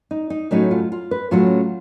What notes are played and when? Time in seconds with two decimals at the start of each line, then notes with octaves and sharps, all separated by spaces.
0.11 D#4
0.30 D#4
0.51 A2 F#3 A3 C#4 D#4
0.71 F4
0.92 F4
1.11 B4
1.31 A2 F#3 A3 C#4 F4